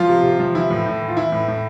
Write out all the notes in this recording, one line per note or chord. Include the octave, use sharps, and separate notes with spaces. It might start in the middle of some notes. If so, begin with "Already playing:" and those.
Already playing: F3 F4
C3
C3
F3
E3 E4
A2
A2
E3
F4
E3 E4
A2
A2